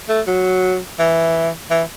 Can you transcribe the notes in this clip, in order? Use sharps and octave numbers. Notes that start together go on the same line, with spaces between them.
A3
F#3
E3
E3